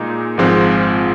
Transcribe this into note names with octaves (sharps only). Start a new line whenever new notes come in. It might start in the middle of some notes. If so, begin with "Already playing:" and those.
Already playing: A#2 G#3 D#4
G#1 G#2 F3 G#3 C4